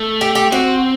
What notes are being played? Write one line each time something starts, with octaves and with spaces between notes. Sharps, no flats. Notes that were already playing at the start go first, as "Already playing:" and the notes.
Already playing: A3
G4
G4
C4 F#4